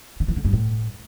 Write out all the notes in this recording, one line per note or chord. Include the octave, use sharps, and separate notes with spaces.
D3
E3
D3
G2
A2